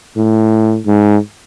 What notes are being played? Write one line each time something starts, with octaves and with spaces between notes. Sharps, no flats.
A2
G#2